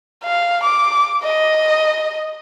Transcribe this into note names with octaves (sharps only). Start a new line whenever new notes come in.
F5
D6
D#5